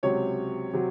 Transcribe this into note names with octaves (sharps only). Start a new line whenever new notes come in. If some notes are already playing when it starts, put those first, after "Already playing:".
C#2 C3 F#3 C#5
C3 F#3